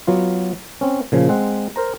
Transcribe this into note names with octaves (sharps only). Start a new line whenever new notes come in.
F#3 B3 F4
C4 C#4
A#2 C#3 F3
G#3 C4 F#5
A#4 C5 A#5